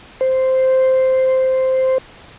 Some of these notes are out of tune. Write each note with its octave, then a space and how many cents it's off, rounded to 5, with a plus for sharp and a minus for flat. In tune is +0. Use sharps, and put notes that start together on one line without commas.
C5 -5